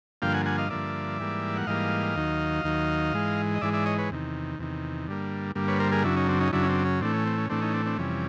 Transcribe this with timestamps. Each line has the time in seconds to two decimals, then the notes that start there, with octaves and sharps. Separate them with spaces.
0.22 G2 D3 F3 A#3 F5 G5
0.33 F#5 G#5
0.45 F#5 G#5
0.58 D#5 F5
0.70 G2 D3 F3 A#3 D5 E5
1.19 G#2 E3 G3 A#3
1.57 F#5
1.67 G#2 E3 G3 A#3 D#5 F5
2.16 D#2 D#3 F#3
2.64 D#2 D#3 F#3
3.13 G#2 E3 G#3
3.55 D#5
3.61 G#2 E3 G#3 D5 E5
3.73 D5 E5
3.86 C#5 D#5
3.98 B4 C#5
4.10 E2 C3 D#3
4.59 E2 C3 D#3
5.07 G2 D3 G3 A#3
5.55 G2 D3 G3 A#3
5.68 B4 C#5
5.79 A#4 C5
5.92 G#4 A#4
6.04 F#2 C#3 F#3 D4 E4
6.16 C#4 D#4
6.28 C4 D4
6.40 C#4 D#4
6.52 F#2 C#3 F#3 D4 E4
6.63 C#4
6.69 C4 D4
6.85 C#4
7.01 A2 E3 A3 C4 D4
7.13 C#4
7.26 C4
7.38 C#4
7.49 A2 E3 A3 C4 D4
7.62 C#4 D#4
7.73 C4 D4
7.86 C4 D4
7.98 F2 C3 E3 G3 C#4